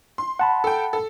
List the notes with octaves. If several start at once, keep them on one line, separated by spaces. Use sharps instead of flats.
C6
F#5 A5 B5
A4 G5
A4